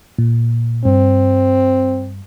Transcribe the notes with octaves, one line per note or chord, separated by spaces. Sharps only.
A#2
G2 C4